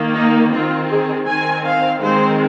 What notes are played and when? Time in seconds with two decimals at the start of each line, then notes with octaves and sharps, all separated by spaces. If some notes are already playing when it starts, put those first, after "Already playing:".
Already playing: D#3 A#3
0.15 D#4
0.52 D#3 C4 F4
0.89 G#4
1.27 D#3 C4 G#5
1.65 F5
2.02 D#3 G#3 C4 C5